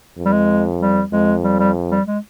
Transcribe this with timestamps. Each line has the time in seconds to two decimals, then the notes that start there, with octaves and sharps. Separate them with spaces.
0.17 F2
0.26 G3
0.33 G#3
0.81 G3
1.12 F2 G#3
1.44 G3
1.60 G3
1.91 G3
2.08 G#3